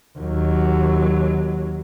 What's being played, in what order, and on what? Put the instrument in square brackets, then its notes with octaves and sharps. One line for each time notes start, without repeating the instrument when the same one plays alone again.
[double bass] D#2 F#3